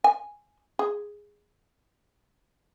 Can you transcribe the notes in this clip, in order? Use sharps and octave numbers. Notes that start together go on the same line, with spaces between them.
G#5
G#4